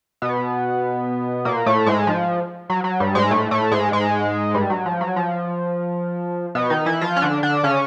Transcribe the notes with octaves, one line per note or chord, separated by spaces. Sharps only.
B2 B3
A#2 A#3
A2 A3
G#2 G#3
F3
F#3
F#3
G2 G3
G#2 G#3
A2 A3
A2 A3
G#2 G#3
G#2 G#3
G2 G3
F#3
F3
F#3
F3
B2 B3
D#3 D#4
E3 E4
F3 F4
C#4
D3 D4
D3 D4
C#3 C#4